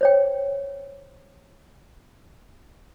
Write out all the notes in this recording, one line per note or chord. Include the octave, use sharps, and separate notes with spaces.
C5 C#5 G5